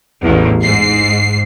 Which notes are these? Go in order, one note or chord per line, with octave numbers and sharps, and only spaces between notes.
A1 E2
G#2 C7